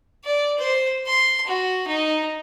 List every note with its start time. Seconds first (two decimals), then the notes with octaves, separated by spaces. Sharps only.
0.24 D5
0.58 C5
1.06 C6
1.47 F#4
1.87 D#4